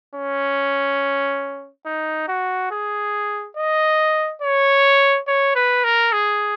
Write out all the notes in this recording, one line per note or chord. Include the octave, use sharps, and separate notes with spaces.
C#4
D#4
F#4
G#4
D#5
C#5
C#5
B4
A#4
G#4